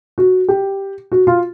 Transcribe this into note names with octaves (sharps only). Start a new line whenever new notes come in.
F#4
G4
F#4
F4